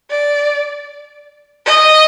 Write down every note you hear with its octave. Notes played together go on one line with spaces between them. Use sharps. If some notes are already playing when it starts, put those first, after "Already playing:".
D5
D#5